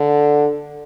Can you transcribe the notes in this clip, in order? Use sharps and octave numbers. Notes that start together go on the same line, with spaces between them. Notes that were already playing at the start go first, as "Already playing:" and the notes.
Already playing: D3